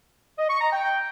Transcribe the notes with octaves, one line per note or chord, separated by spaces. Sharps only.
D#5
C#6
A#5
G5